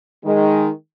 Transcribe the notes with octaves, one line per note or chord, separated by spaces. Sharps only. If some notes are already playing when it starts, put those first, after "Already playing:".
D#3 G#3